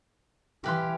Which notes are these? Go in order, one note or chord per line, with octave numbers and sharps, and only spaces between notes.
E3 G4 B4 F5 C6